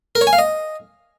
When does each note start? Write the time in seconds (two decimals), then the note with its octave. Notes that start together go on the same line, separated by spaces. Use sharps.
0.15 A#4
0.21 C#5
0.27 G#5
0.33 F5
0.39 D#5